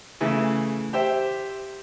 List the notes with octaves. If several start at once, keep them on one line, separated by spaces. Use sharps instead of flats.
C#3 E3 A3
G4 C5 E5 G5